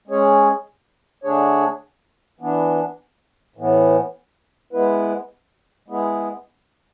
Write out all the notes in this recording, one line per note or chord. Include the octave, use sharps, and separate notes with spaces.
G#3 C#4 G#4 C#5
D3 A3 D4 G#4 C#5
E3 B3 D4
A2 E3 B3
G#3 B3 E4 B4
G#3 B3 E4 G#4